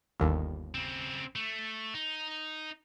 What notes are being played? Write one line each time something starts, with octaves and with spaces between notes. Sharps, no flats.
G1 D#2
C#3 C4
A3
D#4